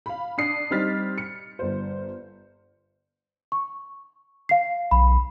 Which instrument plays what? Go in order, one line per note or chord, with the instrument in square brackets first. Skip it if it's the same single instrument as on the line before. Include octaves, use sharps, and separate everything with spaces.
[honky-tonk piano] F5 B5
D4 D#6 C7
G3 C4 D#4 F6 A6 B6
C#7
G1 C5
[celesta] C#6
F5 C7
[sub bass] B1 [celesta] B5